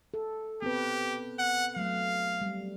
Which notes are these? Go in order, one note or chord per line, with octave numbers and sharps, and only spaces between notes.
A4
B3 C4 G4 B4
F#5
F#3 A3 F5
G3